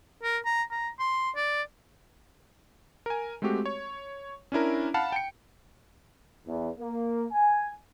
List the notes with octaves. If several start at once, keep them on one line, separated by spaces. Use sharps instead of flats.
A#4
A#5
A#5
C6
D5
A#4 G#5
G#3 A3 C4 F#4 G4
C#5
C#4 D4 E4 A#4
F5 F#5 A5 B5
G5 C#7
E2
A#3
G#5